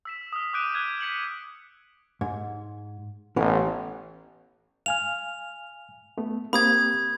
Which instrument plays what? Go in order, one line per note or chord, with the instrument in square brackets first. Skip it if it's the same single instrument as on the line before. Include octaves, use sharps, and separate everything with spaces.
[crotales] E6 B6 E7
D#6 F6
D6 D#6 F#6 G6 D7 D#7
D6 F6 F#6 G#6 D#7
G#6 B6 C#7 F#7
[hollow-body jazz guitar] G#2
[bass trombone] A1 [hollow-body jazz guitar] E3 B3 C#4
[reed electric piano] F5 G#5 F6 [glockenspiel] F7
[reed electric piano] A3 B3
[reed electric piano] A#3 C4 G4 [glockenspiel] B5 D#6 G#6